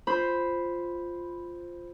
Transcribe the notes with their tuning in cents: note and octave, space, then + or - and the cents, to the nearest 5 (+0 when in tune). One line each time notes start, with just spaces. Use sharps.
F4 +0 C5 +0 B5 +0